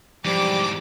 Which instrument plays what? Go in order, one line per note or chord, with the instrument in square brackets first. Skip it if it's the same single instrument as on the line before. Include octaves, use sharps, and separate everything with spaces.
[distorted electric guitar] E2 G#2 [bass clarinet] F3 [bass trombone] G3 [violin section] D6